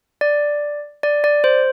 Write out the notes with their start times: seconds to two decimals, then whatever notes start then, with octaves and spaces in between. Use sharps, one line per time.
0.21 D5
1.03 D5
1.24 D5
1.44 C5